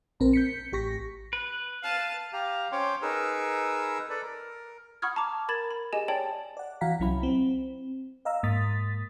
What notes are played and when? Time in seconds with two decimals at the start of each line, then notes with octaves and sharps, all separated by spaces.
0.20 A#1 C4 A#4
0.33 G6 B6 C#7
0.73 A1 G4 C#6 A#6 B6
1.33 B4
1.83 F5 A5
2.33 G4 F5 A#5
2.72 C#4 C5 C#5 G5 C6 D6
3.02 D#4 G#4 A#4 B4 E6
4.10 A4 B4 D5
4.23 A#4
5.02 F#5 B5 C#6 D#6 F6 G#6
5.16 A5 A#5 D6
5.49 A#4 B5 G#6 A6 E7 F#7
5.71 B5
5.93 G4 G#4 D#5 G#5 E7
6.08 C#5 D5 G5 A5 A6 F#7
6.57 D5 F#5
6.81 E3 F#4 F5 F#5 A#5 B6
7.00 C2 F#3 C#4 E4 B5
7.23 C4
8.25 D#5 F5 A#5 E6
8.43 G#2 A#3 D#6 A6 B6